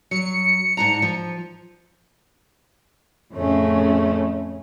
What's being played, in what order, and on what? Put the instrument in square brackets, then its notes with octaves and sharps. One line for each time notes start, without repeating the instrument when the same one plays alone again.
[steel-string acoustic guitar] F#3 [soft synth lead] C#7
[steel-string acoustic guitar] G#2 D4 A#5
F3
[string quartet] F2 A2 C#3 A3 C#4